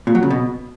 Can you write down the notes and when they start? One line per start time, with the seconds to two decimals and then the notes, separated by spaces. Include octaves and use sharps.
0.07 A#2
0.15 F#3
0.23 C#3
0.30 B2